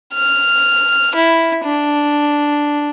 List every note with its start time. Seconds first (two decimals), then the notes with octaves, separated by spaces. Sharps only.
0.14 F6
1.15 E4
1.65 D4